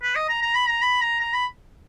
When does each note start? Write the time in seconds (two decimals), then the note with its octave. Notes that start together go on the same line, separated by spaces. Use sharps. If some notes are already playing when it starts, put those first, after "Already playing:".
0.03 B4
0.16 D#5
0.29 A#5
0.42 A#5
0.55 B5
0.68 A#5
0.82 B5
1.01 A#5
1.20 A#5
1.33 B5